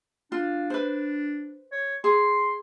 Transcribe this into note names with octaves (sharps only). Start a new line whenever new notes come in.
D4 F4
B4 C5
C#5
G#4 C6